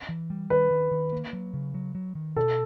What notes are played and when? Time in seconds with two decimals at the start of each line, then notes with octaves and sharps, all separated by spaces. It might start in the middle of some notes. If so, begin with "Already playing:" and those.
0.09 E3
0.30 G3
0.50 D#3 B4
0.71 D#3
0.91 D#3
1.12 A#3
1.33 F#3
1.54 C#3
1.74 F#3
1.95 F#3
2.15 D#3
2.36 B2 A4